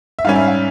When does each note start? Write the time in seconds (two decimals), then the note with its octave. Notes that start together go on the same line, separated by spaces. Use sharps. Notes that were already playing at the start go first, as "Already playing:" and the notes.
0.19 E5
0.24 G#2 G3 C#4 F5
0.36 E5
0.48 F5